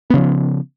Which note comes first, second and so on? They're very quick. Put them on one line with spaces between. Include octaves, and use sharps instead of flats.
B3 C#3 F3